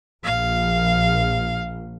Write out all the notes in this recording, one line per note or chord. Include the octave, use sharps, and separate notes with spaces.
A#1 F5